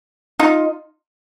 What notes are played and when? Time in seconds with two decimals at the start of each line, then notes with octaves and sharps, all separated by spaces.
0.39 D#4 F4